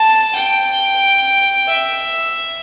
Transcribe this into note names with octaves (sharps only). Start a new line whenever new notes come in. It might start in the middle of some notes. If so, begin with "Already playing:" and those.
Already playing: A5
G5
E5